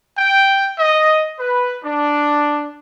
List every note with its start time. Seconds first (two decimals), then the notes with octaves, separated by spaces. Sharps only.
0.18 G5
0.79 D#5
1.40 B4
1.83 D4